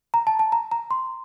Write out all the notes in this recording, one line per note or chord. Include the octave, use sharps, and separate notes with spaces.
A#5
A5
A5
A#5
A#5
C6